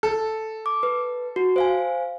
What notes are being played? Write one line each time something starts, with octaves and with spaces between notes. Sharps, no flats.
A4
D6
B4
F#4
C5 F5 G#5